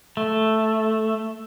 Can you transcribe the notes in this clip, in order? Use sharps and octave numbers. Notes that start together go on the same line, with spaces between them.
A3